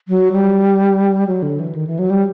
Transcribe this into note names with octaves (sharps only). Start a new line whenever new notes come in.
F#3
G3
F#3
D3
E3
D#3
E3
F#3
G3